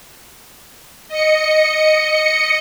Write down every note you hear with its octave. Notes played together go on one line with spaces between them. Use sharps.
D#5 C#7